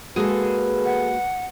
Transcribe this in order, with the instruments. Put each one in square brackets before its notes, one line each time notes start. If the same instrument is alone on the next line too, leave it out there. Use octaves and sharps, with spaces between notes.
[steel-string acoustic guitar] G#3 A#3 F#4 [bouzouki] G#4 A4 [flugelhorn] B4
[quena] F#5